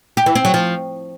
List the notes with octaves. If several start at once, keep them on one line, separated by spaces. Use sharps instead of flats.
G4
E3
C4
F#3
F3